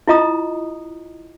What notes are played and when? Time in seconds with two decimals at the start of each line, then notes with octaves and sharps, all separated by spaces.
0.08 E4 F4 D#5 A#5 D#6